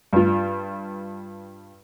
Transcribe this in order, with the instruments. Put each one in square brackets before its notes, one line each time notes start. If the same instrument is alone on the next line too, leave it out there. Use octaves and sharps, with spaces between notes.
[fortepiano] G2 F4